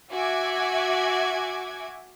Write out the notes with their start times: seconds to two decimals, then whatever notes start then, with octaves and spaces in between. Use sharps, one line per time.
0.11 F#4 E5 G#5 D6 G#6